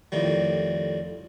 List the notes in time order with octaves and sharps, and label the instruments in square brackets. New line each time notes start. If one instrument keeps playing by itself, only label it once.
[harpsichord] F2 A2 D#3 G3